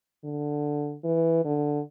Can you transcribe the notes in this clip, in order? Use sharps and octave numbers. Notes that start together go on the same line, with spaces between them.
D3
E3
D3